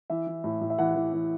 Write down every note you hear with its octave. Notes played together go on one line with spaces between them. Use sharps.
E3 E5
E3
A2
A2
E5
E3 F#5
E3
E3